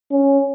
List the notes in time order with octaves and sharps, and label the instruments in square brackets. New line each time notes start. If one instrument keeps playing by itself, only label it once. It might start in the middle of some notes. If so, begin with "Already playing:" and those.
[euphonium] C#4